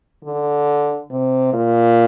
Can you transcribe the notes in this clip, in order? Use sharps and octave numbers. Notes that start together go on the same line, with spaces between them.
D3
C3
A#2